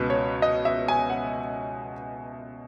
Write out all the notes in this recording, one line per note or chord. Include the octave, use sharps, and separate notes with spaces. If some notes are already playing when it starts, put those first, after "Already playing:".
Already playing: C#2 B2 B4
C#5
D#5
E5
G#5
F#5